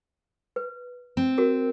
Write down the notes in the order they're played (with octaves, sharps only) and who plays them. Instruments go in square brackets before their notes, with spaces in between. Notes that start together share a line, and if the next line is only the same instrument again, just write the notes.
[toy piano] B4
[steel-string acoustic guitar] C4
[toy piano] F#4 A#4